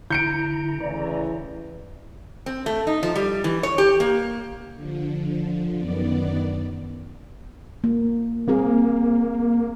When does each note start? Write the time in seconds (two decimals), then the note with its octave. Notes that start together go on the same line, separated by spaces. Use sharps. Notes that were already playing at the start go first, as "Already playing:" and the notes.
0.10 D3 E4 A#5 G6 C#7 D7
0.80 A2 C#3 E3 D5 A#5
2.46 C4
2.66 A3
2.87 D#4
3.03 F3
3.15 G3
3.44 E3
3.63 C#5
3.78 G4
4.00 A#3
4.76 D3 F3
5.78 F#2 D#3 B3 D5
7.84 A#3
8.48 G3 A#3 C4 G#4